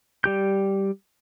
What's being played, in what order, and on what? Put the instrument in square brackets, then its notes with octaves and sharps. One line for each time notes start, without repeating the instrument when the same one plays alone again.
[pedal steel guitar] G3 G4 G6